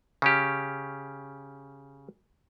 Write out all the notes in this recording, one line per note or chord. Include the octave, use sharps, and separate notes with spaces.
C#3 C#4 G4